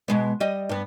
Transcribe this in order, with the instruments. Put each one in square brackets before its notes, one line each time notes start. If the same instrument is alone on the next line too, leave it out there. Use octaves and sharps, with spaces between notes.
[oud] B2 G#3 B3
G3 D#5
G2 B3